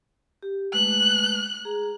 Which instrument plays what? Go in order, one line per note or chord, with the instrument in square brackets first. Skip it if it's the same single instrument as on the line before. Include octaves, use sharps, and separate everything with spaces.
[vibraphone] G4
[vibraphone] G#3 A3 B4 [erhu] F#6
[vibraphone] G#4 A#5